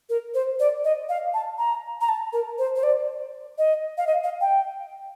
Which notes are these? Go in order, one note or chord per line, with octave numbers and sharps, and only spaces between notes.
A#4
C5
D5
D#5
F5
A5
A#5
A#5
A5
A#4
C5
C5
D5
D#5
F5
D#5
F5
G5